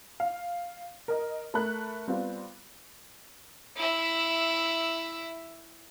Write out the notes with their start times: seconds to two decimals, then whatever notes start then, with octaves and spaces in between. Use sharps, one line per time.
0.20 F5
1.08 A#4 D#5
1.54 A3 A#4 A5 B5 F#6
2.08 G3 B3 C4 F4
3.76 E4 E5